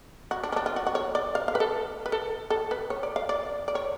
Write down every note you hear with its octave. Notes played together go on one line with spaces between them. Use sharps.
F#4
D4
C#4
D4
F4
F#4
F#4
C#5
D5
F5
F5
B4
A4
B4
A4
A4
B4
C#5
D5
F5
D5
D5
C#5